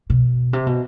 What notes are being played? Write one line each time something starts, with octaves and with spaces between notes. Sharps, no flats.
B2
C3
B2